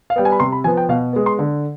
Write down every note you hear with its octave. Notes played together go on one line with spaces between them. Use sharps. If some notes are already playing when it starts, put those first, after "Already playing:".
F5
G3 B3 G5
G#5
B5
C3 C6
B5
F3 B3 G#5
G5
B2 F5
G#3 B3
C6
D3